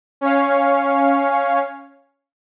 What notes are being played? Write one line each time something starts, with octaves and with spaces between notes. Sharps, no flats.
C#4 C#5 F5